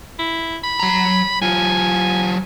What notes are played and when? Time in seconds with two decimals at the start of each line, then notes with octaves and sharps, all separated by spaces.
0.19 E4
0.63 B5
0.80 F#3 A#5
1.42 F#3 F4 G#5